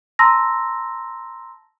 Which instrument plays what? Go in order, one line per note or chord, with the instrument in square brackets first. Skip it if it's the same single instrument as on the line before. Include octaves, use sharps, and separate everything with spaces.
[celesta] A5 A#5 C6 E6 A#6